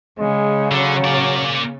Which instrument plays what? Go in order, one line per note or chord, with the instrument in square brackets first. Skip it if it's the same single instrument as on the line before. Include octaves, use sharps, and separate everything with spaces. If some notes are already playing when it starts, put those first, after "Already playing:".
[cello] C#3 [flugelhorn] G#3
[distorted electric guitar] D3 [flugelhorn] F#3
[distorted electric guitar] A#3 D5